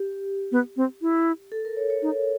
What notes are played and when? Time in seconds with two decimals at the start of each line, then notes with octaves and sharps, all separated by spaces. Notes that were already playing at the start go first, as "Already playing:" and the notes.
Already playing: G4
0.52 B3
0.77 C4
1.02 E4
1.52 A4
1.65 A#4
1.77 C#5
1.90 C#5
2.02 D#4 C#5